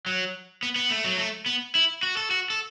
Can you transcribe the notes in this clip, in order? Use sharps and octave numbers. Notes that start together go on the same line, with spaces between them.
F#3
B3
B3
A3
F#3
A3
B3
E4
F#4
A4
F#4
A4